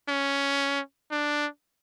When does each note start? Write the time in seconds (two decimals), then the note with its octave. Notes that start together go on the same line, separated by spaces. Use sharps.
0.09 C#4
1.11 D4